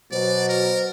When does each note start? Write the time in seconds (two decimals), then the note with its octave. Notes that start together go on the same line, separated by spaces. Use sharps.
0.12 B2 F#3 C5 D5
0.49 A#4